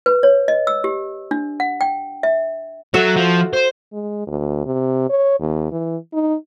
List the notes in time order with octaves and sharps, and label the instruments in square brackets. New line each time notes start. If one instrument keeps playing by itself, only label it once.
[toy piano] B4
C#5
D#5
E6
G4
D4
F#5
G5
E5
[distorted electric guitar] F#3 [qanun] F#4 A4 E5
[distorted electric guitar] F3
C5
[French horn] G#3
D2
C3
C#5
D#2
E3
D#4